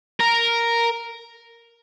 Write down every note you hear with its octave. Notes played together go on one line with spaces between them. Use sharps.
A#4